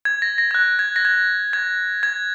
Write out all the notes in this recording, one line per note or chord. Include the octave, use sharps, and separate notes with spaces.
G#6
A#6
A#6
G#6
F#6
G#6
A#6
G#6
G#6
G#6